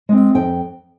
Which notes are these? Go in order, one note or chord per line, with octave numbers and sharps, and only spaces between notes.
G#3 C4
F2 G5